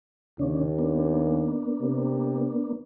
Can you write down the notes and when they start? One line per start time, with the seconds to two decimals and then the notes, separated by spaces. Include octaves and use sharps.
0.39 D#2 C#3 C#4 D4
0.79 A#3 B3 D4
1.81 C3